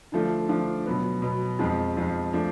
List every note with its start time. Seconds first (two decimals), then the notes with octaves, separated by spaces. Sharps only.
0.12 D3 F3 A3 D4 F4
0.49 D3 F3 A3 D4 F4
0.86 B2 F#3 B3
1.22 B2 F#3 B3
1.59 F2 F3 G#3
1.96 F2 F3 G#3
2.33 F3 A3 D4